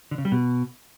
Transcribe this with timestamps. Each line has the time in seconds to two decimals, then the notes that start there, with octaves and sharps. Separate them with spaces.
0.11 D3
0.18 C#3
0.25 G3
0.32 B2